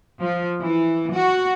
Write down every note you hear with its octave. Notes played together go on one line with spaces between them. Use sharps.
F3
E3
F#4